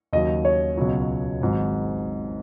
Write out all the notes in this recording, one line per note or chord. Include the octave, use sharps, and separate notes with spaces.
D#2 C#3 F#3 D#5
C#5
C#2 B2 F#3
G#1 G#2 F#3